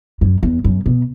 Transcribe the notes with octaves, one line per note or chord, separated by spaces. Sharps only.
F#2
E2
F#2
B2